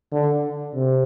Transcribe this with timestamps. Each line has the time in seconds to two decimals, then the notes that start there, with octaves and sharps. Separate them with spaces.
0.12 D3
0.74 C3